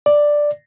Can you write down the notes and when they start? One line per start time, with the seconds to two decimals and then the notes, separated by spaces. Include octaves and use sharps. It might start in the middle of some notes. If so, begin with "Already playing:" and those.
0.06 D5